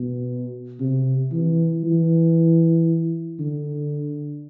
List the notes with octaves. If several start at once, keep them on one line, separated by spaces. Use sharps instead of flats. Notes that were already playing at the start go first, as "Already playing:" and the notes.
Already playing: B2
C3
E3
E3
D3